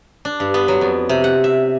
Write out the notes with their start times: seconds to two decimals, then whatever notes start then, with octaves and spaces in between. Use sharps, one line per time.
0.25 D4
0.40 G2
0.54 B3
0.68 F#3
0.81 F2
1.09 C3
1.24 F#5
1.44 E5